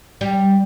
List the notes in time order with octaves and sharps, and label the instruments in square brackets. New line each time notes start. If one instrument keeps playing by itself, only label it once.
[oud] G3